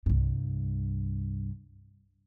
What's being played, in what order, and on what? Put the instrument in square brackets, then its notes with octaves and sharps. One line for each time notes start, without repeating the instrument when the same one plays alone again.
[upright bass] C2 G2